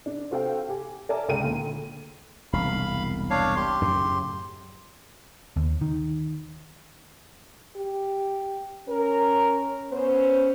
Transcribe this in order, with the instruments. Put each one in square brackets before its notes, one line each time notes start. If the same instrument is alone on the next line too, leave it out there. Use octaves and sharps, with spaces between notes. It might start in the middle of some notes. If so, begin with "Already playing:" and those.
[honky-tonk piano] D4
C4 F#4 A4 F5 G5
G4 G#5
A#4 D5 E5 G#5 A5
C#2 G#3 A#4 G5 D#7
D2 A#2
[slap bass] E1 C2 [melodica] F5 B5
[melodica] D4 C#5 F5
G4 C6
[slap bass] F#2 A2 C#3
[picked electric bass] D#2
D#3
[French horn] G4
[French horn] C#4 [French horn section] A#4
[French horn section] B3 C#4 C5